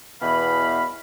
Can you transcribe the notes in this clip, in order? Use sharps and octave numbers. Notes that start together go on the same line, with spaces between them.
E2 B2 E3 F5 B5